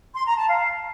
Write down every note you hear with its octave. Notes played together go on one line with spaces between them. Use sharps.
C6
A#5
A5
F5